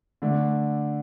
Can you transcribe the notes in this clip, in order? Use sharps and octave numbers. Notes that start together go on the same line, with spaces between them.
D3 A3 D4